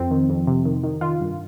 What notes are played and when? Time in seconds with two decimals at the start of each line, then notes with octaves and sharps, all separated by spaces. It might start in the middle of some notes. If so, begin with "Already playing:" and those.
Already playing: F2 C4
0.11 D#3
0.30 F2
0.47 C3
0.65 D#3
0.83 D#3
1.01 D#3 F4
1.20 G2